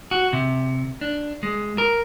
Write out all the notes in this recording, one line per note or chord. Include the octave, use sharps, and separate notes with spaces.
F#4
C3
D4
G#3
A#4